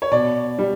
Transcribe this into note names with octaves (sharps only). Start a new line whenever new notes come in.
C#5
B2 D5
G3